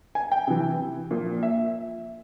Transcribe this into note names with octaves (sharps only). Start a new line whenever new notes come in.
G#5
G5
C3 E3
A#2 F3
E5